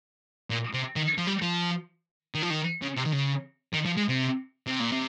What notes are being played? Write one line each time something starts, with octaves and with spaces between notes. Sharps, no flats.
A#2
C3
D#3
F3
G3
F3
D#3
F3
D#3
C#3
C3
D#3
C#3
D#3
F3
G#3
C3
C3
A#2
C3